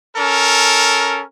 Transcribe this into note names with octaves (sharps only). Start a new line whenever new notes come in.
C#4 A4 A#4